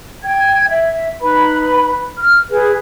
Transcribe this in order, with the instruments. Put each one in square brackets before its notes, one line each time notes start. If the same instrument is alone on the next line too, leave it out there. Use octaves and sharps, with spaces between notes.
[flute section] G5 G#6
E5
D#4 B4 B5
F6
G#4 B4